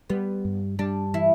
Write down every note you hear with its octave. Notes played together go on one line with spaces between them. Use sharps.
G3 B3
G2
G3 D4
E3 E4